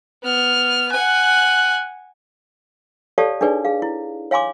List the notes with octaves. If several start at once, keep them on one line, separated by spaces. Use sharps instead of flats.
B3 F6
F#5 G#5 F#6
G4 A4 C#5 D5 F5 A5
D4 D#4 G#4 B4 C#5 D5
G#4 F5
E4
C#5 F5 G#5 C6 D6